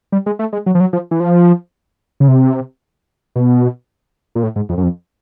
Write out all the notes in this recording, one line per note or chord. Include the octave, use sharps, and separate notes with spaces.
G3
G#3
A3
G#3
F#3
F3
F#3
F3
E3
F3
C#3
C3
B2
A#2
A2
G#2
F2
F#2
F2